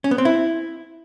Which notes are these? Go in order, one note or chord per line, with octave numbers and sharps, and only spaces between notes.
C#4
B3
C4
E4